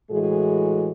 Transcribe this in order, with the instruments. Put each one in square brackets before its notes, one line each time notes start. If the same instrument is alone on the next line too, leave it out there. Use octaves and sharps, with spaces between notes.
[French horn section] A2 E3 G#3 F#4 G#4